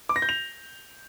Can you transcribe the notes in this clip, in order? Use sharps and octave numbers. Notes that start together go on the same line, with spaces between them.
D6
A#6
G6
F7